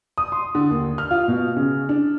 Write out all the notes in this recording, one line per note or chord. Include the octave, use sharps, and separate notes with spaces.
D#6
C6
D3
D#2
F6
F4
B2
C#3
D4